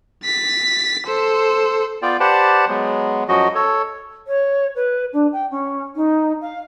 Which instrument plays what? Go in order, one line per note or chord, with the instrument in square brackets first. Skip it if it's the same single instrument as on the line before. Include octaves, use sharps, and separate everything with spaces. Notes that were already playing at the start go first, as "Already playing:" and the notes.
[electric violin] A6 B6
A4 C5
[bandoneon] B3 F4 D5 G5
G4 B4 C5 D5 F#5 A5
F#3 G#3 B3
F#2 F3 F#3 F#4 D#5
A4 C#5
[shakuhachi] C#5
B4
D4
G5
C#4
D#4
F5